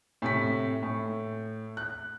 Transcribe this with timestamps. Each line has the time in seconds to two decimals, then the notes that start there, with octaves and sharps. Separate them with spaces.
0.22 A2 C3 B6
0.82 A2
1.77 F#6